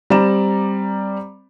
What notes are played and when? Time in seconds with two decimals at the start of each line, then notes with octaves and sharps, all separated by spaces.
0.10 G3 C4 D5 A#5 E7